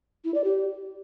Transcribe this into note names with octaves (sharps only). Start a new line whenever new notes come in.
E4
D5
G4